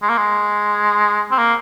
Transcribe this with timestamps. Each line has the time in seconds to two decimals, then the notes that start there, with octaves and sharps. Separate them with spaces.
0.02 G#3
0.09 A#3
0.18 G#3
1.31 C4
1.38 A#3